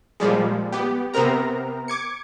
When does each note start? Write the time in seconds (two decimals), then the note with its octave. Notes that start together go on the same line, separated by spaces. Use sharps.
0.20 A#2 F3 G3 G#3
0.72 B3 G4
1.14 C3 B3 C4 A#4 A#5
1.88 D6 G#6 C#7